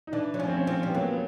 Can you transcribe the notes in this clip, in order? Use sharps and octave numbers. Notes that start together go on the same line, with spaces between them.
D#4
E3 D4
F#3
F3 C#4
C4
C#4
F3 C4
G3
B3
F#3 A#3
B3